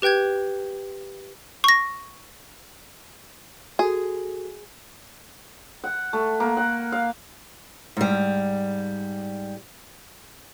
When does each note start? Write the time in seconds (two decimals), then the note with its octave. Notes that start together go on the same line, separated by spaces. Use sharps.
0.02 G4 B4 G5 G6 G#6
1.64 C#6 A#6
3.79 F#4 G#4 A4
5.84 F#5
6.13 A3
6.40 A#3
6.57 F#5
6.92 F5
7.97 G#2 G3